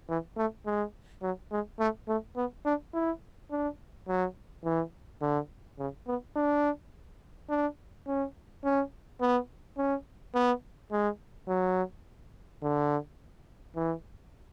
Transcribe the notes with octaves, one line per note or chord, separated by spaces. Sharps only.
E3
A3
G#3
F#3
G#3
A3
A3
B3
D4
E4
D4
F#3
E3
D3
C#3
B3
D4
D4
C#4
C#4
B3
C#4
B3
G#3
F#3
D3
E3